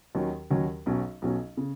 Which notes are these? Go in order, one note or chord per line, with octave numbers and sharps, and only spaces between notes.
D#2 D#3 F#3 C#4
D#2 D#3 F#3 C#4
B1 B2 F#3 C#4
B1 B2 F#3 C#4
C#3